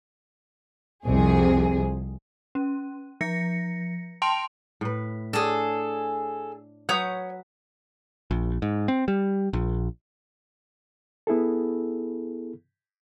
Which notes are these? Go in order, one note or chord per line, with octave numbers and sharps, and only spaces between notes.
C2 F2 C3 G#4
C#4
F3 A#6 C#7
G5 A5 C6 D7 F7
A2 B4
D4 G#4 A4 C#5
F#3 B4 C#5 F#5 D#6 G6
A#1
G#2
C4
G3
A#1
B3 E4 G#4 A4